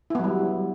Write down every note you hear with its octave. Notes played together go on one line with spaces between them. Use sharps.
F#3 G3 B3 E4